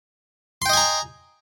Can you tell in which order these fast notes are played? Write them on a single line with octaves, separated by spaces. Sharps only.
C6 G5 D#5 G#5 A#5